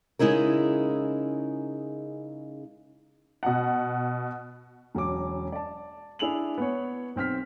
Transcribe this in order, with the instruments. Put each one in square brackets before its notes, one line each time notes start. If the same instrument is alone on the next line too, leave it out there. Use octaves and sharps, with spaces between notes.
[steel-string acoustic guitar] C#3 G#3 D#4 E4 A#4
[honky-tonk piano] B2 F#5
[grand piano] E1 F#3 C#4 D6
D5 A5
D4 E4 G#4 F7 F#7
B3 C#5
B1 C4 F6 B6